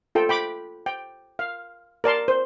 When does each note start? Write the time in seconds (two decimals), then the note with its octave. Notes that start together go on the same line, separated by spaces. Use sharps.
0.15 F4 A4 G5
0.29 G5 B5 D6
0.86 G5
1.39 F5
2.04 A#4 D5 A5 C6
2.28 C5